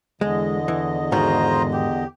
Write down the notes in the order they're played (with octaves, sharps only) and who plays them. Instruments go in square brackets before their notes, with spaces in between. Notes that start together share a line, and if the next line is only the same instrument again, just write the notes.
[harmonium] E2 D3 D#5 [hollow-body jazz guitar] G#3
[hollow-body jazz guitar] E3
[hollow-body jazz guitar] G#2 D#3 F#4 [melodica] F4 C5 A#5
[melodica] G4